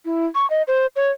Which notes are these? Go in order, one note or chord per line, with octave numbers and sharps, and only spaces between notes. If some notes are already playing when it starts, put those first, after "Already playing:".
E4
C#6
D#5
C5
C#5